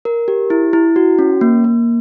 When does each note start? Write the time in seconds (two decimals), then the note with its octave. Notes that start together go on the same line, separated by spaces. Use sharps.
0.05 A#4
0.28 G4
0.50 E4
0.73 E4
0.96 F#4
1.19 C#4
1.41 A#3
1.64 A#3